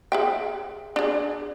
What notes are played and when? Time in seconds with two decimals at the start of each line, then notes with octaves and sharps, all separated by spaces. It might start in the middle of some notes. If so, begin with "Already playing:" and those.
0.12 G#4 E5 G5
0.96 D4 G#4